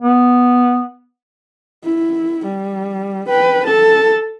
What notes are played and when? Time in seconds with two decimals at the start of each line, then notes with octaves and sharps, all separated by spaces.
0.02 B3
1.84 E4
2.46 G3
3.29 B4 G5
3.67 A4 A5